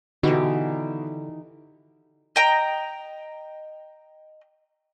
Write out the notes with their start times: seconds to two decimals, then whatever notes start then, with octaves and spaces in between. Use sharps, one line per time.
0.23 B2 D3 E3 D#4 G4
2.36 D#5 G5 A#5